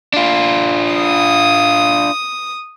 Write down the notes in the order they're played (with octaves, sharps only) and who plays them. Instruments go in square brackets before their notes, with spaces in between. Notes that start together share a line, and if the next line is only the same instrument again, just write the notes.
[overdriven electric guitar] D4 F4
[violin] D#6